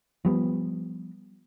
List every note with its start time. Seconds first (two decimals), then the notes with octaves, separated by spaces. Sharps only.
0.25 F3 G3 B3